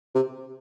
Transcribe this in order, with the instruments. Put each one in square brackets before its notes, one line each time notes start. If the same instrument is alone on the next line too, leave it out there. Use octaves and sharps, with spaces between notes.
[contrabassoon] C3